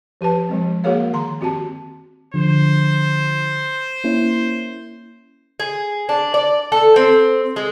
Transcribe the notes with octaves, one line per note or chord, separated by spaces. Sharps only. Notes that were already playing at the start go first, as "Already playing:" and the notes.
F3 G4 B4 A5
F3 G#3 C4
A#3 F#4 G#4 A#4 C#5 F5
D#3 A#5 C6
C4 F#4 G4 A5
D3 F3 C5
A#3 C#4 E4
G#4
D4
D5
A4
C4
G#3